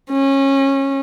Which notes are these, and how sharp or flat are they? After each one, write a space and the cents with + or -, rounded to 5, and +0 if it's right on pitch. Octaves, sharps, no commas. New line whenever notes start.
C#4 -25